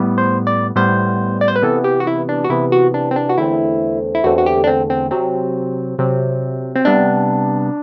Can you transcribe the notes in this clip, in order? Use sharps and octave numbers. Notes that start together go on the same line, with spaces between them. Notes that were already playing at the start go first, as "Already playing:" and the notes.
Already playing: A2 G3 B3
C5
D5
A2 G3 B3 C5
D5
C5
B4
C3 E3 B3 A4
G4
F#4
E4
D4
F#4
C3 E3 B3 E4
F#4
D4
C4
D4
F#4
E2 D3 A3 C4 E4
E4
E2 D3 A3 C4 F#4
F#4
G4
D4
C4
C4
C3 F#3 C4
C3 F#3 C4
C4
C3 G3 B3 D4